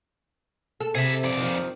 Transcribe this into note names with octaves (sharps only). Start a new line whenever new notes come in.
A4
C3 G#4 E5
F2 D5
D#3 F3